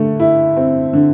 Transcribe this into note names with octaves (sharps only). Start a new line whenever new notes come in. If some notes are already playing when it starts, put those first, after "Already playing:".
Already playing: D3 A3
E4
C4
D3